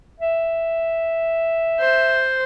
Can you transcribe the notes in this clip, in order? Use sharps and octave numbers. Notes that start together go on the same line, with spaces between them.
E5
C5